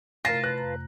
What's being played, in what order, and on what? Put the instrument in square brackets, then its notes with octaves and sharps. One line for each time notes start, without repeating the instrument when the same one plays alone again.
[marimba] C3 A3 [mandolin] F4 A5 [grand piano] A#4 A#6
[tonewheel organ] B4 [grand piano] F#6
[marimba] F2 A#5